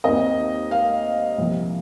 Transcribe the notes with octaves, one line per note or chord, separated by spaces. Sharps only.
D#2 D#3 C4 D#5
F5
C2 A#2 F3 C4